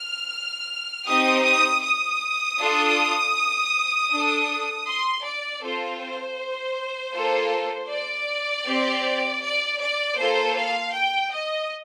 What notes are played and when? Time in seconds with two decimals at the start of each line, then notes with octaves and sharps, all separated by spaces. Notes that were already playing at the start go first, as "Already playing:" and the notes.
Already playing: F6
1.07 C4 D#4 G4 D#6
1.45 D#6
1.83 D#6
2.60 D4 F4 A4
4.12 D4 A4
4.87 C6
5.24 D5
5.62 C4 F4 A4 C5
6.01 C5
7.14 A#3 F4 A4
7.91 D5
8.66 C4 G4
9.43 D5
9.81 D5
10.18 A#3 F4 A4 C5
10.57 F5
10.94 G5
11.32 D#5